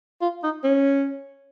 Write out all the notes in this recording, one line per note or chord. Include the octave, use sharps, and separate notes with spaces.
F4
D#4
C#4